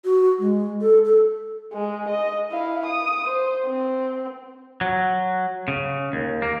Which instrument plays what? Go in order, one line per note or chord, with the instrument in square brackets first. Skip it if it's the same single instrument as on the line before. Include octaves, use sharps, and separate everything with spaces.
[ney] F#4
G#3
A4
A4
[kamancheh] G#3
D#5
E4 F5
D#6
C5
C4
[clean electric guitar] F#3
C#3
D#2
A#3